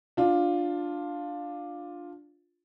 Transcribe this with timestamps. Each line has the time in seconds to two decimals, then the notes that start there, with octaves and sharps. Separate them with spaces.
0.17 D4 F4